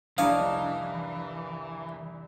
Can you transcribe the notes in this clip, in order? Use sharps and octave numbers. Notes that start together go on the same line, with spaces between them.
F1 C2 E3 D4 E4 C#5 D#5 F5